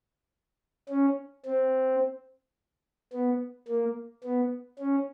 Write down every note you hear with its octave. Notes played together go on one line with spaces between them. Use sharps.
C#4
C4
B3
A#3
B3
C#4